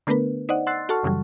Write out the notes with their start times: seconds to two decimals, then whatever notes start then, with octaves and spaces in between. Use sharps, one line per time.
0.07 D3 A3 B3 D4 A#4 B4
0.49 D#4 C5 D5 D#5 F#5
0.67 F#5 C6 E6 F#6 A6 C7
0.89 F#4 A4 F#5 A5 C#6 F6
1.03 F#2 C#3 E3 F#3 G3